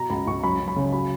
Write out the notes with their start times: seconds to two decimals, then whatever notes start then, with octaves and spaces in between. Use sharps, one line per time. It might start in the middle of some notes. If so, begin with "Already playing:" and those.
Already playing: B2 A#5
0.10 C#2 B5
0.27 C#2 C#6
0.43 F#2 B5
0.60 F#2
0.68 B5
0.76 C#3
0.93 F#3 B5